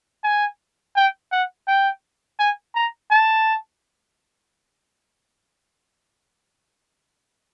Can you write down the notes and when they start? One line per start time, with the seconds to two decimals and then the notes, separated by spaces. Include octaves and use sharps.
0.24 G#5
0.96 G5
1.32 F#5
1.68 G5
2.39 G#5
2.75 A#5
3.11 A5